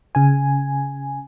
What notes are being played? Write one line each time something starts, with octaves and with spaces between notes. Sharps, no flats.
C#3 G#5